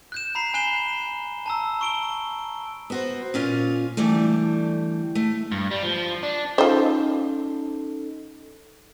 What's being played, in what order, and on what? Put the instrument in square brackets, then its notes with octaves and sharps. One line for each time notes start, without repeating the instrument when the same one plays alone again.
[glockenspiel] F#6 G6 E7
A#5 B5 C7
G#5 F#6 C7 E7 G7
A5 A#5 E6
C#6 D7 G7
[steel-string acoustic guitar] B3 F#4 C5
A#2 C#4 F4
D3 E3 G3 A3
A3
[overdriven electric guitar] G2
G3
F3
D4
[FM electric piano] C#4 D#4 A4 [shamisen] F4 C5